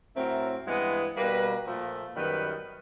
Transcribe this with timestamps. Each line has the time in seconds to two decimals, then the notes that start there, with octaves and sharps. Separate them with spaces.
0.16 A2 F#3 A3 C4 A#4
0.66 G2 E3 G#3 B3
1.15 B2 G3 A#3 B4
1.65 A#2 F3 A3
2.15 F#2 D#3 G3 B3 B4